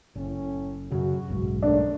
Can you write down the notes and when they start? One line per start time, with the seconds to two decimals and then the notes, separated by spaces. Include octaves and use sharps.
0.15 F#1 A2 C#4
0.92 F#2 C#3 F#4
1.28 F#1 B1 G#2
1.63 D#2 A3 D4